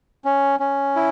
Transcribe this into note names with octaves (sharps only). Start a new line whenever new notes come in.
C#4
C#4
E4